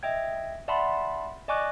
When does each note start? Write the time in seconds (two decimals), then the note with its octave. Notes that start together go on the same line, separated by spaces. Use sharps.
0.03 D#5 E5 G5 G#6
0.68 D5 E5 F#5 A5 B5 C6
1.48 D5 D#5 G#5 C#6 D6 F#6